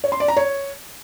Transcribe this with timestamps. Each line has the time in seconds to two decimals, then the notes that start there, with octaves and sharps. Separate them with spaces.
0.04 C#5
0.12 C6
0.20 D5
0.28 A#5
0.37 C#5